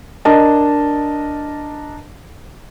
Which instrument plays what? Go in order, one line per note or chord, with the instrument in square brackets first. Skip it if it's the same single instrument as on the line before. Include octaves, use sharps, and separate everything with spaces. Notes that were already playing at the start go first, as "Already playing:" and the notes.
[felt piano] D4 A#4 D#5 A5